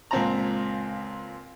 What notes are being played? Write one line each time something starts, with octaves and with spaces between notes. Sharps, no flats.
C#2 A#2 C4 A5 A#5